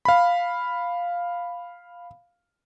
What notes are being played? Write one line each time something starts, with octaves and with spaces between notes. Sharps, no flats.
F5 B5